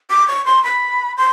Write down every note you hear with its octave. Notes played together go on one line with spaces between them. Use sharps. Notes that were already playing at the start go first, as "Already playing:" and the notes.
D6
C#6
C6
B5
C6